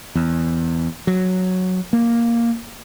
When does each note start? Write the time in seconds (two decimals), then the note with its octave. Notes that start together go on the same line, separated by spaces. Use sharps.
0.15 E2
1.07 F#3
1.93 A#3